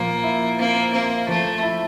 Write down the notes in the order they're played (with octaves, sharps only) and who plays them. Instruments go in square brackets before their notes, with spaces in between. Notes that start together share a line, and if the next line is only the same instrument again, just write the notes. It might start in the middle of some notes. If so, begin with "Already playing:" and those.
Already playing: [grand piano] A#2 F3 [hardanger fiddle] A#3
[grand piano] E4
[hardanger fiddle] A#3 [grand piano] C4
[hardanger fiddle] A#3 [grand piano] C4
[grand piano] F3 [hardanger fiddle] A3
[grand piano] E4